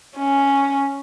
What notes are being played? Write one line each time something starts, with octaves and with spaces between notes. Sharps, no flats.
C#4